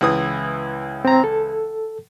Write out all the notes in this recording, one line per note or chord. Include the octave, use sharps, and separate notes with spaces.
C#2 E3 D#6
C4 A#5
A4